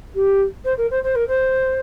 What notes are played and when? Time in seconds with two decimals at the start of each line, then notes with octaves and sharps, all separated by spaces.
0.14 G4
0.64 C5
0.77 A#4
0.90 C5
1.03 C5
1.15 A#4
1.27 C5